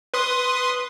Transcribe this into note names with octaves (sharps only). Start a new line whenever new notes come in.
B4 C6 D#6